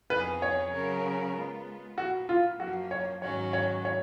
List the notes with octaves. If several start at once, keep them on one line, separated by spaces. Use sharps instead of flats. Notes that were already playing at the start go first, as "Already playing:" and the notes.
F2 F3 B3 D#4 G#4 B4
C#5
C#3 F#3 C#4 F#4 A#4
G#3 B3 F4
A#2 F3 B3 F#4
F4
F#2 F3 A#3 F#4
C#5
G#2 D#3 F#3 C#4 F#4 C#5
C#5
C#5